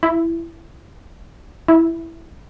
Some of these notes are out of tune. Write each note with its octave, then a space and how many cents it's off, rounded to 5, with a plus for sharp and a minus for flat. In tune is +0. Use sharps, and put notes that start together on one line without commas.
E4 +15
E4 +0